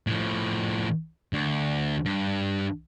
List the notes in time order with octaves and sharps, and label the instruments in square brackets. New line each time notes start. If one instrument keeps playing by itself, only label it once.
[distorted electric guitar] A2 F3
D2
G2